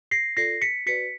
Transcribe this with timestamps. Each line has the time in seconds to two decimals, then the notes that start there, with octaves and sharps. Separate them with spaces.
0.11 A#6 C7
0.37 F4 A4 D5 A#6 C7
0.62 B6 C#7
0.86 F#4 B4 D5 B6 C#7